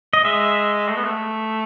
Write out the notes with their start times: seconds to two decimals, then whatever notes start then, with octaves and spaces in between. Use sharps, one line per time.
0.13 D#5
0.24 G#3 E5
0.89 A3
0.96 B3
1.04 A3